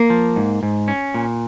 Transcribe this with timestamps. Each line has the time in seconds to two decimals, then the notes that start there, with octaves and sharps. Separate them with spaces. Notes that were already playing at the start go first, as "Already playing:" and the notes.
Already playing: A#3
0.10 F3
0.36 G#2
0.63 G#2
0.88 C#4
1.14 A#2